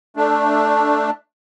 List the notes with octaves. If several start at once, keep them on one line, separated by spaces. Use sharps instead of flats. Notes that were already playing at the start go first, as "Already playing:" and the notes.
A3 D4